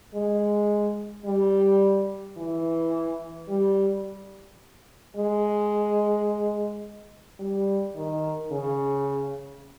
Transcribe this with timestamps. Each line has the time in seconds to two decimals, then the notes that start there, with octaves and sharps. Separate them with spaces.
0.14 G#3
1.25 G3
2.37 E3
3.49 G3
5.16 G#3
7.39 G3
7.95 D#3
8.51 C#3